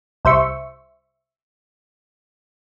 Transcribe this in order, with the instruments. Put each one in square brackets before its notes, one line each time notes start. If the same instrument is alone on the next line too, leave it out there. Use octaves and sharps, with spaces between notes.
[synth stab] C2 C5 E5 C#6